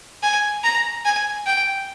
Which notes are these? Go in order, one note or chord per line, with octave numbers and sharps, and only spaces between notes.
G#5
A#5
G#5
G5